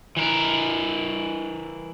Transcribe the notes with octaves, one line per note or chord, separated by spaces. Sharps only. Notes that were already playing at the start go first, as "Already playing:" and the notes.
E3 A#4